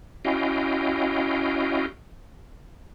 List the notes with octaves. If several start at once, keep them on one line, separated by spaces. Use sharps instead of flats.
C#4 E4 F#4 D#5 F5 G5